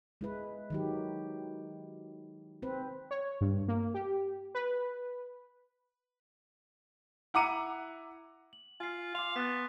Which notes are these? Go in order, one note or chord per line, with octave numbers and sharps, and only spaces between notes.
G#3 E4 B4
D#3 F#3 G4
C4 B4
C#5
G2
A#3
G4
B4
E4 F#5 A#5 D6 C#7 D#7
F#7
F4 G#5 C7
F5 C6 D6
B3 F#6 A6 B6